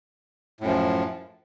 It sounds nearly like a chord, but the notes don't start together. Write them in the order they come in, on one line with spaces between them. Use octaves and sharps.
A2 F#2 F3